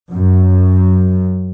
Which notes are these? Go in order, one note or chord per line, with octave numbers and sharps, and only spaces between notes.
F#2